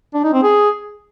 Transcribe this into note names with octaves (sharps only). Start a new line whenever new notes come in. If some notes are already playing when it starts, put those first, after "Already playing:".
D4
D#4
C4
G#4